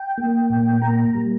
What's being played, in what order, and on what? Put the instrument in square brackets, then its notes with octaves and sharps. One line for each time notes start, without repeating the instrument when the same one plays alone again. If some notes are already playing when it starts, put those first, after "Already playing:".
Already playing: [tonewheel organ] G5
A#3
A#2
A#3 A#5
A#5
G3